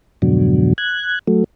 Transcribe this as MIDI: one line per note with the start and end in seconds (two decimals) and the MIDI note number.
0.22 0.73 41
0.22 0.73 44
0.22 0.73 47
0.22 0.73 50
0.22 0.73 54
0.78 1.19 90
0.78 1.19 92
1.27 1.44 54
1.27 1.44 57